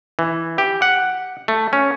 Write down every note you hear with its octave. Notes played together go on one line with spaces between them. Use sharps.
E3
G4
F#5
A3
C#4